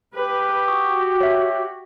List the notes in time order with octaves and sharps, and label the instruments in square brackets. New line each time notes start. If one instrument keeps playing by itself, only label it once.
[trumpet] G4 [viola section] B4
[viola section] F#4 [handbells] C#6 D#6
[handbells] C#5 E5